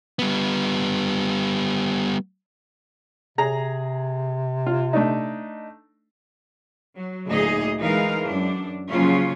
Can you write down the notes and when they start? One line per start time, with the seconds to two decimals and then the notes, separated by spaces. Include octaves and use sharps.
0.19 G3 B3
3.38 C3 G#4 A#5
4.66 F4
4.93 A3 D4 D#4
6.95 F#3
7.28 D2 A#2 D#4 G#4 D#5
7.81 E3 G#3 D#4 A#4 F5
8.24 F#2 D4
8.89 C#3 F3 F#3 A#3 C#4 F4